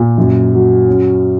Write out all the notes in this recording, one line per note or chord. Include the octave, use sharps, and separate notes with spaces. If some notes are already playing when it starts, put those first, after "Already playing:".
Already playing: A#2
F#2
F#3
C#4